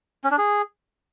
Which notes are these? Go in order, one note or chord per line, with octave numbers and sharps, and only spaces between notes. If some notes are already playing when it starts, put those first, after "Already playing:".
C#4
D4
G#4